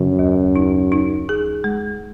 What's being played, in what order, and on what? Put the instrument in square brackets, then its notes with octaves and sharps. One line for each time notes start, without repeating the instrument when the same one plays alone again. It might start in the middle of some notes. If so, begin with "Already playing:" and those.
Already playing: [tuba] F#2 [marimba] C#3
[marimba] D#2
D#4
D#4
G#4
G#3